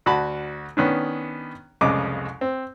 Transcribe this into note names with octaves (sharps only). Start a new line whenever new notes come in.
D2 F#4 F#5 A5 B5
D#3 B3 C#4 D4
C2 F2 C#3 G#3 D#5 D6
C4